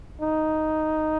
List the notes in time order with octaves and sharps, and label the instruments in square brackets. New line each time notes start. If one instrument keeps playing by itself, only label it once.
[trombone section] D#4